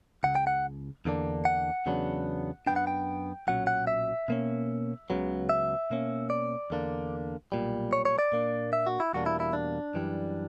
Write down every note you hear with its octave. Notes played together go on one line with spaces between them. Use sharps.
C#2 C#3 F#5
G5
F#5
E2 D3 A#3 D4
F#5
E2 C#3 F#3 B3 D4
F#2 E3 B3 D4 G5
F#5
G5
B1 A#2 F#3 C#4 F#5
F#5
E5
B2 A#3 C#4
C#2 C#3 F#3 B3
E5
B2 A#3 C#4
D5
E2 D3 A#3 D4
B1 A#2 G3
C#5
C#5
D5
A#2 A#3 D4
E5
F#4
E4
E2 B2 G3 A#3 D4 F#4
E4
E4
D4
F#2 E3 G3